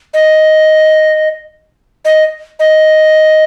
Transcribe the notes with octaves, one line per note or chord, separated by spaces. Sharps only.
D#5
D#5
D#5